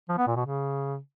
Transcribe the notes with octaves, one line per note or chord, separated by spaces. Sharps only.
F3
B3
A#2
B2
C#3